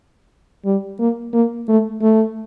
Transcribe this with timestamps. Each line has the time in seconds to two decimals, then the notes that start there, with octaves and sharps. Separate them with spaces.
0.65 G3
1.00 A#3
1.33 A#3
1.68 A3
2.02 A3